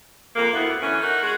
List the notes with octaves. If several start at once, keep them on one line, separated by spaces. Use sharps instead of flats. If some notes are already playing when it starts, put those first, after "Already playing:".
F2 A#3
D2 B3 E4
D3 E3 C#4
D#4 F#4 A#4
G#3 F#4